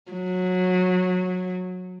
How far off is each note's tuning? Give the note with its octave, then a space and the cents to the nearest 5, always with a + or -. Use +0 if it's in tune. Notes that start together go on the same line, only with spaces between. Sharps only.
F#3 -20